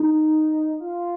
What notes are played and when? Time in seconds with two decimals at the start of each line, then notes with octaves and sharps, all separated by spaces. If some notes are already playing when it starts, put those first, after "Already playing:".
Already playing: D#4
0.80 F4